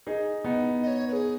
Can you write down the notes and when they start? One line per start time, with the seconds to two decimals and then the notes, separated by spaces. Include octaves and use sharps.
0.07 D#4 G#4
0.44 B3 D#4
0.83 D#5
0.87 C#5
1.08 B4
1.13 G#4